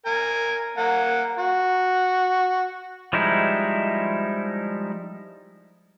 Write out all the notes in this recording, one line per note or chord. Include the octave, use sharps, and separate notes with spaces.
A#4 G#5
A#3 F#5 A#5
F#4
F3 G3 G#3 D#4 E4